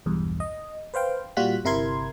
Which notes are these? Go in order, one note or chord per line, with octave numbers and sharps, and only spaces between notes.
B1 E2 G2
D#5
B4 C5 F5 G5
A#2 G3 F4 F#4 F#6 B6
G1 C3 E4 A#4 C6 G#6